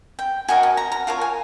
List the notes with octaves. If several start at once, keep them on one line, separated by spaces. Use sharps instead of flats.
G5
F#4 A#4 D#5 G#5
A5
A#5
A#5
F4 A#4 C#5 A5
G#5